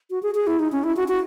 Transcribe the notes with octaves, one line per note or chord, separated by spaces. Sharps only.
F#4
G#4
G#4
E4
D#4
C#4
E4
F#4
F#4